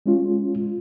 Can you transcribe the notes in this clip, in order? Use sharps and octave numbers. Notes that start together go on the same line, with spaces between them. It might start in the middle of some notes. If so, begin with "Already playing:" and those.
G#3 C#4 F4